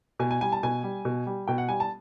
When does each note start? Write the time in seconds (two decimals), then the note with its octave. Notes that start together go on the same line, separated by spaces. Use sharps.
0.19 B2 G#5
0.31 G#5
0.41 G3 G#5
0.52 A5
0.63 B2 G#5
0.83 G3
1.05 B2
1.26 G3
1.48 B2 G5
1.58 F#5
1.69 G3 G#5
1.80 A5